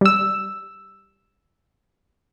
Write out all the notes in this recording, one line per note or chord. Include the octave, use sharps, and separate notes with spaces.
G3 E6